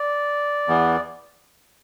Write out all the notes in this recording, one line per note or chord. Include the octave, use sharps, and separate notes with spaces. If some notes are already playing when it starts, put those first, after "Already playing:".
Already playing: D5
E2 E3 B3